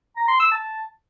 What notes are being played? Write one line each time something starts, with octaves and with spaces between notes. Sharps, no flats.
A#5
C6
E6
A5